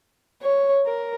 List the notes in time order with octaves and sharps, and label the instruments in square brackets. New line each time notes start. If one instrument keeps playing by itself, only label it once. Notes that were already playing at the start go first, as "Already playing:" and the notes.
[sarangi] C#5
A#4